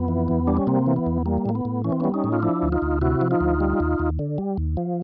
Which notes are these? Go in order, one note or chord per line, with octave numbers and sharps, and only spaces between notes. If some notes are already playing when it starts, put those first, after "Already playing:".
Already playing: F2 B3
E3
E2
G3 D4
C#4
C3 A#3 C4
E3
B3
E2
G3 A#3
A2 A#3
B3
A2
E3 C#4
C4
G3 B3 C#4
C#4 D#4
A2
F4
F3 D4 E4
D2
D#4 F4
D2
C3 E4 F#4
F3
D#4 F4
D2
G3
D#2
D#2
D3
G3
D#2
F3